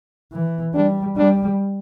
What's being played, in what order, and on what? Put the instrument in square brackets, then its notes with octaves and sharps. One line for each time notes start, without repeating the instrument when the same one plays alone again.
[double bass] E3
[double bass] G3 [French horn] D4
[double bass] G3 [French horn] D4